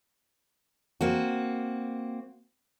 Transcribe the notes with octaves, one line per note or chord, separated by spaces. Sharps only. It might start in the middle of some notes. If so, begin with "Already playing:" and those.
A#3 C4 F#4